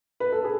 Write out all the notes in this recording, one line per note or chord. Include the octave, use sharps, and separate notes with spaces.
B4
A4
G#4